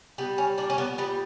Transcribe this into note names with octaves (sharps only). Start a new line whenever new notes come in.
G3 B3
C#4
A#2 D4
C#4
B3
G3 B3